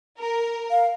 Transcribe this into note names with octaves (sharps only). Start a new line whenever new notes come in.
A#4
F5